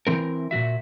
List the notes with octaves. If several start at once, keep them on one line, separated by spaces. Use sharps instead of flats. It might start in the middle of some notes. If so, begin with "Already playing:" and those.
E3 C4 A#4
A#2 G#3 F#4 E5